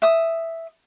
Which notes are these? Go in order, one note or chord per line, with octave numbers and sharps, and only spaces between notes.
E5 D#6